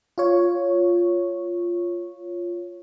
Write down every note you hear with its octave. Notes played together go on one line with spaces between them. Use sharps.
F4 C#5